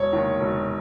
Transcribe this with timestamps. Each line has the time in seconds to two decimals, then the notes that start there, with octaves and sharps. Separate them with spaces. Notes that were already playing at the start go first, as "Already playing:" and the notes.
Already playing: E1 C#5
0.13 D#2 D#3
0.40 E1